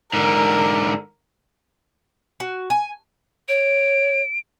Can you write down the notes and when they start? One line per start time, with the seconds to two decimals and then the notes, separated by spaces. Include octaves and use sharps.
0.13 G#2 D3 A#4
2.40 F#4
2.70 G#5
3.48 C#5 D7